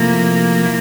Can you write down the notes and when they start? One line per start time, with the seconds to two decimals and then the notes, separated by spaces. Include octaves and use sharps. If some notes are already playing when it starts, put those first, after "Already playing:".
Already playing: C3 F3 A3 A#3 E4
0.65 E4